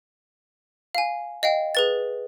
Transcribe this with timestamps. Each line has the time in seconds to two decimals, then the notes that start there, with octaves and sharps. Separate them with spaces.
0.95 F5 G#5
1.43 D#5 F5 G5
1.75 G#4 B4 A6